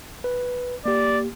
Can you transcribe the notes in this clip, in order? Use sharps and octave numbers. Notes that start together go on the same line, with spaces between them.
B4
A#3 G4 D5